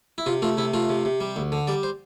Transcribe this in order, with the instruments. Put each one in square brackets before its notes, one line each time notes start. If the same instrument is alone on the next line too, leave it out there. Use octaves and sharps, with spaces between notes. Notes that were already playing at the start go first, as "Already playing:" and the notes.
[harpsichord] E4
C3 F4
A3 F4
C3 E4
A3 F4
C3
C3
G3
D2
D3
G3 D5
C5